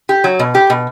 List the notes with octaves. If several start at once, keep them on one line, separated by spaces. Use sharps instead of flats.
G4
F#3
B2
G4
B2